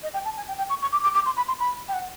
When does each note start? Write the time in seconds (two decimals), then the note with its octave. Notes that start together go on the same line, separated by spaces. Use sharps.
0.03 D#5
0.14 G5
0.25 A5
0.37 G#5
0.48 G5
0.58 G5
0.70 C#6
0.82 C#6
0.92 D6
1.03 D6
1.14 D6
1.26 C6
1.37 B5
1.48 C6
1.60 B5
1.88 G5
1.93 F#5